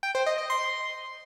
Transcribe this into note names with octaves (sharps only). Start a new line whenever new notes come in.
G5
C5
D#5
D#5
C6